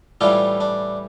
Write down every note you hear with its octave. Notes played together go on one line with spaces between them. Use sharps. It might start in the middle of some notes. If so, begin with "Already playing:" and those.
A2 E3 G3 D4 F4
D4